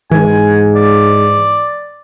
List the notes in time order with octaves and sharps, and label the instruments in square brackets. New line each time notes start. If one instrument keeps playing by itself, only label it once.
[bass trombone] G#2 [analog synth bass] E3 [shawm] G#5
[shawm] D5